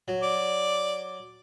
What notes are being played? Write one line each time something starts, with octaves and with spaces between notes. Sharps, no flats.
F#3
D5